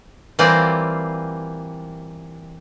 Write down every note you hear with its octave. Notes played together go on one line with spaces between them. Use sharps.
E3 G3 A#3 C4 F4 D5